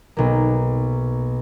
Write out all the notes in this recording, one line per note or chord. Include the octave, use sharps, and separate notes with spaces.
B1 A#3